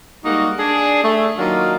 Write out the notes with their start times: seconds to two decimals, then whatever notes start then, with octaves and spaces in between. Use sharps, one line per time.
0.24 G3 G#3 A#3 D#4 F#4
0.59 D4 G#4
1.03 A3
1.37 D#3 F#3 A#3 D4 D#4 F4